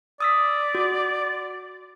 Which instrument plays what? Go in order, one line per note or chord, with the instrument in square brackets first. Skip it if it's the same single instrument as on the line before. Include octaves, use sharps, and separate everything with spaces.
[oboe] D5 [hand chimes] D#6 E6 B6
[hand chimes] F#4